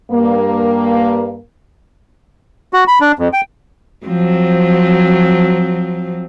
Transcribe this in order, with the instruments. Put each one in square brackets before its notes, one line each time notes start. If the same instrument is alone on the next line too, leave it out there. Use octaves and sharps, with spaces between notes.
[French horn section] G2 A#3
[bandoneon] F#4
B5
D4
F2
G5
[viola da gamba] F3 F#3 C4